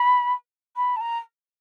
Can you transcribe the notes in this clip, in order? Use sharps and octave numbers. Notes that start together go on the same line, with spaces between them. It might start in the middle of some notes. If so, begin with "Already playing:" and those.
Already playing: B5
B5
A5
A#5